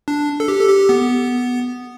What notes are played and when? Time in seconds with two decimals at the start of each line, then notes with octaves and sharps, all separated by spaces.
0.08 D4
0.40 A4
0.48 G4
0.61 A4
0.69 G4
0.89 B3